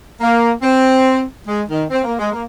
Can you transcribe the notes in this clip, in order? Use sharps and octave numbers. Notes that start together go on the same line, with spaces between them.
A#3
C4
G#3
D#3
C4
A#3
G#3
A#3